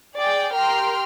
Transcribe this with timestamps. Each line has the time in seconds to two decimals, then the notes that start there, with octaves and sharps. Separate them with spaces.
0.16 G#4 D5 G5
0.54 G4 A#4 G5 A#5 C6 F6